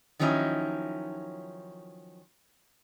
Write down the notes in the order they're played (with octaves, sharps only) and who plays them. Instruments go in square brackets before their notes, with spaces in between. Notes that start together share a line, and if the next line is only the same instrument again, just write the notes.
[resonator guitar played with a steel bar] D#3 F3 F#3 C#4 D#4 E4